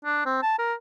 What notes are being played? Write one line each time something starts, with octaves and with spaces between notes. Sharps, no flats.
D4
C4
A5
A#4